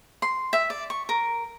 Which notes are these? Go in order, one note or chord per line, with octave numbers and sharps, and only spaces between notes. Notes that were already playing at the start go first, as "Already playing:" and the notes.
C6
E5
D5
C#6
A#4